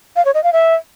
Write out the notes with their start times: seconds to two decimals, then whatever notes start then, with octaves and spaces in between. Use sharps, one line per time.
0.16 F5
0.25 C#5
0.34 D#5
0.44 F5
0.53 E5